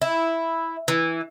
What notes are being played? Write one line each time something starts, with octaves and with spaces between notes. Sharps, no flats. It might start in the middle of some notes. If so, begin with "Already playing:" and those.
E4
E3